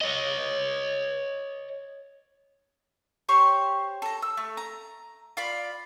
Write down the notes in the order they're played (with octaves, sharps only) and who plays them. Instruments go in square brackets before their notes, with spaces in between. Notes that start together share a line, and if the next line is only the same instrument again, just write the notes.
[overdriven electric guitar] C#5 D#5
[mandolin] G4 C5 C#5 C#6
A4 A#5
E6
A3
A#5
F4 D5 B5